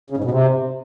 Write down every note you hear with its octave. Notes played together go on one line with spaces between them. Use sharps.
C#3
G#2
B2
C3